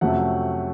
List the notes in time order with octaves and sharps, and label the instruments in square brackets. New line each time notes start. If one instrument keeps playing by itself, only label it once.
[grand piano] F2 C3 F#3 A3 C#4 F#5